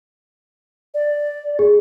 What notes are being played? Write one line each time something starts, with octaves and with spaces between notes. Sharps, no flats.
D5
G#4